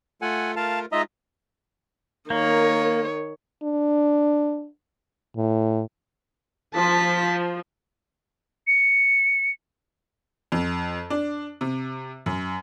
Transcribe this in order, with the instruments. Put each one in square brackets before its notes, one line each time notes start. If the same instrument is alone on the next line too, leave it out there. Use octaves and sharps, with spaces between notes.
[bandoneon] A3 F4 A4 [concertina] F#5 G#5
[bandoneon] A3 F4 A#4 [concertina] F5 A5
[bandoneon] G#3 D#4 F4 [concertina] D#5 E5 A#5
[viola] D#3 C#5 [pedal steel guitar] A#3
[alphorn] D4
A2
[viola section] F3 [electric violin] A5 B6
[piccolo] C#7
[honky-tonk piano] F2
D4
C3
F#2